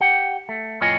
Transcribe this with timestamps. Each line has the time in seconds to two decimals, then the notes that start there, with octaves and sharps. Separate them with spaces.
0.01 G4 F#5 G5
0.49 A3
0.81 F2 A2 F4 C#5 D#5 G#5